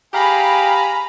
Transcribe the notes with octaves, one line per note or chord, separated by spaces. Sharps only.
G4 G#4 F5 G#5 A#5 B5